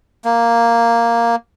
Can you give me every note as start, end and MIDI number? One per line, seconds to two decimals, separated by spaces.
0.25 1.36 58